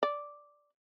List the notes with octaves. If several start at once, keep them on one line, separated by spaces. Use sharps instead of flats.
D5